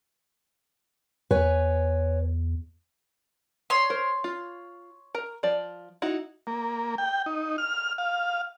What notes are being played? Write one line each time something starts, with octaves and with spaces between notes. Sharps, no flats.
E2 B4 C#5 G#5
C#5 C6
A#4 C5
F4
A#4 A#5
F3 D5
D#4 E4 F#4
A#3
G5
D#4
F6
F5